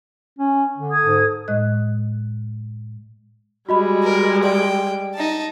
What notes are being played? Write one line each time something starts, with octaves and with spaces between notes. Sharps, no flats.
C#4
D3
A4 D#6 G#6
G#2
A2 G#3 D#5 F#6
G3 G#3 F#4 D#5 B5
A#4
D5 G5
D#4 A5